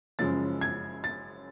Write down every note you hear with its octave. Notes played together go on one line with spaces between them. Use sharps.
F#1 F#2 C#3 F3 G#3 A6
G#6
A6